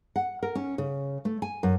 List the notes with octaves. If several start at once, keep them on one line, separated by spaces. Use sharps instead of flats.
F#5
A#4
C#4
C#3
A3
G#5
F#2